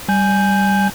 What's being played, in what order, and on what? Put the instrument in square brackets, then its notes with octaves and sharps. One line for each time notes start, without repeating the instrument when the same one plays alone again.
[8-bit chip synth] G3 G#5 G6